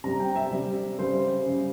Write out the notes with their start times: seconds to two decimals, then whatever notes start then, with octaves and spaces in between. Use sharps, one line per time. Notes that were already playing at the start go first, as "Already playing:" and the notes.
0.04 C3 G3 A#5
0.20 G5
0.36 E5
0.52 C3 G3
0.99 C#3 G3 C5
1.46 C#3 G3